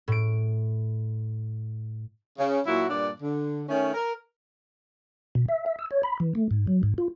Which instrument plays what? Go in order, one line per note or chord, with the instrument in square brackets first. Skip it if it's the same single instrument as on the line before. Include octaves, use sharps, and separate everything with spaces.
[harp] A2 D7
[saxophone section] C#3
A#2 F#3 E4 F#4
G2 A#2 D4 D5
D3
D#3 A3 C#4
A#4
[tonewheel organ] B2
E5
E5
E6
C#5
B5
E3
A3
G#2
F#3
G#2
F4